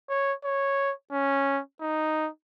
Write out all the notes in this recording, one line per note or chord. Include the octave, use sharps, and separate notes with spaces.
C#5
C#5
C#4
D#4